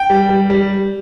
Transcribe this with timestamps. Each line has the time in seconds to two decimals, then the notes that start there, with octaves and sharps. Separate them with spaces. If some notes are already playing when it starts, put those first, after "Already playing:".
Already playing: G5
0.10 G3
0.29 G3
0.50 G3